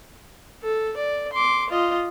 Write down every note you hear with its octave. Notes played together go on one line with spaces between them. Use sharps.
A4
D5
C6 D6
F4 D#5